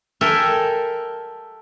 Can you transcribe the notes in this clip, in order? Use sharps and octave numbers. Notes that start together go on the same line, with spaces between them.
A4 A#4 E5 G5 G#5